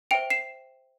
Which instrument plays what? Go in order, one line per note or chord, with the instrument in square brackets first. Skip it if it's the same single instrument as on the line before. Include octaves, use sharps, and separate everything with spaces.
[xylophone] C5 E5 G5 D7 F7
C7 E7